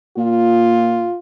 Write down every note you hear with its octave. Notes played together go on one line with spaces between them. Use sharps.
A#2 F4